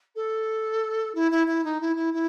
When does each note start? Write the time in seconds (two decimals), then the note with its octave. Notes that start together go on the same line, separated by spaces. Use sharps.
0.15 A4
1.14 E4
1.31 E4
1.46 E4
1.64 D#4
1.80 E4
1.96 E4
2.13 E4